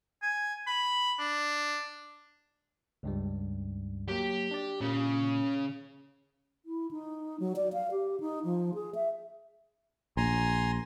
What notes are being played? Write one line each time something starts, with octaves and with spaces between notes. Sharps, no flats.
G#5
B5
D4
C#2 G2 G3
F#3 A#3 G4
D4 D5
A#2 C#3 A#3
E4
D#4
F#3
D5
F5
G4
D#4
F3
G#4
E5
A#1 G#5 A#5 C6